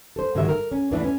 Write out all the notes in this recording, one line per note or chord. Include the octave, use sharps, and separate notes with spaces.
A4 C5
G#2 D3 D#3 F#3 G3 E5
A#4
C#4
E2 A2 E3 D4 E4
C#4